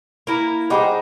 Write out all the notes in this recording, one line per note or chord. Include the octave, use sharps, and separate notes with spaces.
A#3 E4 A#4
G3 D#4 G#4 C5 F#5 D6